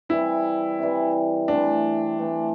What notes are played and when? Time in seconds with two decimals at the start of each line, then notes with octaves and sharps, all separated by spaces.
0.09 C3 E3 G3 E4
0.79 C3 E3 G3
1.48 E3 A3 C4 D4
2.18 E3 A3 C4